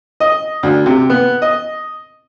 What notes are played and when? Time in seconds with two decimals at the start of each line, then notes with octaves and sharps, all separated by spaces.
0.20 D#5
0.63 D2
0.86 C3
1.10 B3
1.42 D#5